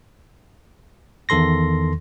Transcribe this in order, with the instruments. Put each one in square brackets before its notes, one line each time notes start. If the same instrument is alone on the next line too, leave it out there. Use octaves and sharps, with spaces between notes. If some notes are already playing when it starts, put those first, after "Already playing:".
[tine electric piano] E2 D#3 A4 C6 A#6